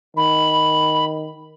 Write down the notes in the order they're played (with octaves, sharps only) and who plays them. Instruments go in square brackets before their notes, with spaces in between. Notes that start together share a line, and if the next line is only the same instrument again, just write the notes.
[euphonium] D#3 [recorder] B5